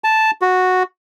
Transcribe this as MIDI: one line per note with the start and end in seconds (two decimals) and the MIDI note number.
0.04 0.31 81
0.42 0.83 66